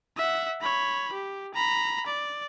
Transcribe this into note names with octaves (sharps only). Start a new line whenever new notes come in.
E5 F#5
C#5 B5
G4
A#5 B5
D5